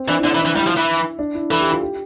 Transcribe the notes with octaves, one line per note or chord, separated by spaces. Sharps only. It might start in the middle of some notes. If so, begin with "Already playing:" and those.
Already playing: C4
E3 D4
E4
D3 D4
E3
D4
E3
G3 E4
F3
E3
D4
E4
E3 A4
G4
F4
G4